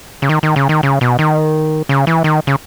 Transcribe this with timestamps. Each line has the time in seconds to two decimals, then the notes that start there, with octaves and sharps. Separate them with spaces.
0.22 C#3
0.29 D#3
0.43 D#3
0.56 C#3
0.69 D#3
0.83 C#3
1.01 B2
1.19 D#3
1.89 C#3
2.07 E3
2.24 D#3
2.47 C#3